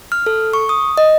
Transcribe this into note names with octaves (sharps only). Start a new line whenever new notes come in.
F6
A4
C#6
D#6
D#5